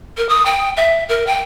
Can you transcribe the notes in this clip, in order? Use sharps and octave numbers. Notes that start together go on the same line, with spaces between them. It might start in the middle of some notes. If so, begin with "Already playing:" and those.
A#4
D#6
G5
E5
A#4
G5